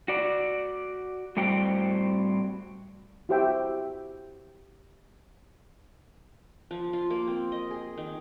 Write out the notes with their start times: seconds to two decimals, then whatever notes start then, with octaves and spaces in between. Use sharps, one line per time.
0.08 F#4 D5
1.37 A2 G3 C4 F#4 G5
3.29 E4 F#4 G4 C5 E5 G5
6.71 F3
6.93 F4
7.10 A#3
7.28 C4
7.52 D#5
7.71 G#4
7.97 D#3